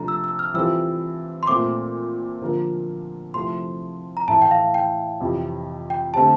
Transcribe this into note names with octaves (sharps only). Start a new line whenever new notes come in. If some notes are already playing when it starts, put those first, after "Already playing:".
Already playing: C3 F3 A3 D4 F4 A#5
E6
E6
F6
E3 G3 C4 F4 A4 E6
C6
A#2 A3 C4 D6
D3 F3 A#3 F4 A#4
C3 F3 A3 C4 E4 C6
A#5
A2 E3 A3 E4 A5
G5
F5
G5
F2 C3 E3
G5
D3 A3 C4 G4 A5